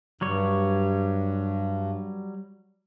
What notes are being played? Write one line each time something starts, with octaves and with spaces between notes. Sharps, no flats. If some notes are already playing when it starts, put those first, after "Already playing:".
G2 F#3 G3 C#5